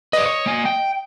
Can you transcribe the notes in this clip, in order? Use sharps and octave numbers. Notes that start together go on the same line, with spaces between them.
B4 D5 D#5
C#5
A#3 G#5
G5